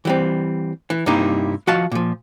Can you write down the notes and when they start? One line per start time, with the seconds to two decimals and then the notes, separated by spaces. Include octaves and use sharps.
0.05 E3 G3 C4
0.90 E3
1.06 G2 C3 G3 A#3 D#4 E4
1.67 F3 F#4 D#5 F5 A5
1.92 A#2 F3